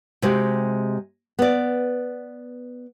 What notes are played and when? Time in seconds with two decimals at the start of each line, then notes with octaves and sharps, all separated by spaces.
0.22 C3 G#3 F#4 G4
1.39 B3 D5